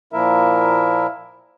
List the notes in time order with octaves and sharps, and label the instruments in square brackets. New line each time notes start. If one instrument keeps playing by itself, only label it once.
[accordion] A#2 F3 A#3 E4 A#4 E5